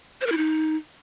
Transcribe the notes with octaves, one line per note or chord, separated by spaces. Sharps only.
C5
A#4
E4
D#4